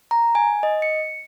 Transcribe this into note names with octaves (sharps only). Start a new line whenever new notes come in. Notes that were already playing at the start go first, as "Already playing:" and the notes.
A#5
G#5
D#5
C#7